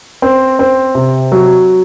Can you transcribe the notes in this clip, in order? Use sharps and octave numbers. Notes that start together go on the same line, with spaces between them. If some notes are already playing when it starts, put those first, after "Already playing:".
C4
C4
C3
F#3